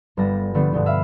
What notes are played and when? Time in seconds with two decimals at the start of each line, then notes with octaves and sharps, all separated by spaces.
0.17 G1 G2 G3 G4 A5 A#6
0.54 D3 F3 G3 A3 B3 D4
0.73 G2 B2 D3 G#3
0.86 E5 F5 B5